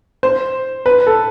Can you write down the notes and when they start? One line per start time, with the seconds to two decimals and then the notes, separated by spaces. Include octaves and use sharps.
0.23 C5
0.86 B4
1.07 A4